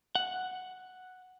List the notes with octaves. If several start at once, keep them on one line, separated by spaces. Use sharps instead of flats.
F#5